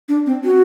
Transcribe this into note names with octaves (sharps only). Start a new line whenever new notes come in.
D4
C4
F#4